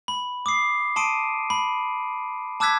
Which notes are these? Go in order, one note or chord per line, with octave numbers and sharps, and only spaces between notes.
B5
D6 D#6 C7
A5 C6 D#6 D7 D#7
B5
A5 D6 E6 F#6 G#6 B6